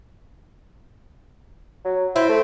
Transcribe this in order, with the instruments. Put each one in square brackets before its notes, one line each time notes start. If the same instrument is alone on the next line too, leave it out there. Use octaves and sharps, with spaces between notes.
[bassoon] F#3
[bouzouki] C4 [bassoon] E4
[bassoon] A3